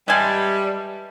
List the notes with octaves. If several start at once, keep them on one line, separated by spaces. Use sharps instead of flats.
G3 G#3 B4 E5 G#5 A5